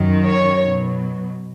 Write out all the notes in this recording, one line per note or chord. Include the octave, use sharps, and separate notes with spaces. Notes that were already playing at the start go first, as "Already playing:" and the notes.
Already playing: F#2 D#3 F#3
C#5
B2 F#3